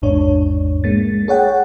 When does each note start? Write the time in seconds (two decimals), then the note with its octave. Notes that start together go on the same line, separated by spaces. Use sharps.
0.02 A1 E2 G#2 D4 C#5
0.84 G#3 A#3 A6
1.28 G#4 C#5 F#5 G5